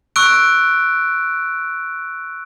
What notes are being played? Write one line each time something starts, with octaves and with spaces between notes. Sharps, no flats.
C#6 E6 F#6 D7